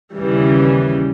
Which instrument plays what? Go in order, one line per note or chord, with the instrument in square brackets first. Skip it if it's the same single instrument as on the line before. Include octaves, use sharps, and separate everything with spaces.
[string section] D#2 C#3 E3 G3